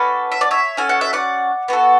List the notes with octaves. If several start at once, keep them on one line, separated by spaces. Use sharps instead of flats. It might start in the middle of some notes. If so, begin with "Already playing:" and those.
Already playing: C#4 F#4 A4 B4 D5
E5
D5
C#5 E5
C#4 F#4 A4 G#5
F#5
E5
D5 F#5
B3 F#4 A4